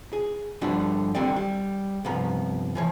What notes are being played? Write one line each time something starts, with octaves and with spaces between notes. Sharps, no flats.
G#4
G2 D3 F3 G3 D4 F#4
D3 D#3 G3 C4 D5
G3
C2 G2 F3 B3 A#5
E3 F3 C#5